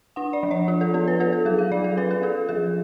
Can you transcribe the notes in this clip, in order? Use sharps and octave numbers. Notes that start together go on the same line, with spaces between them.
D4 F#5
D5
F3
C#5
F4
A4
B3 A4
B4
F4 A4
A4
F#3 G#4
F5
F#3 D5
A4
C#4 B4
G#4
F4 A4
F3 G#4